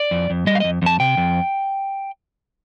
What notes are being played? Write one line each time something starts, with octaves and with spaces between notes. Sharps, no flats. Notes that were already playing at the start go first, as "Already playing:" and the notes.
Already playing: D5
F2
F2
G3 D#5
F5
F2 D#5
F2 A5
C3 G5
F2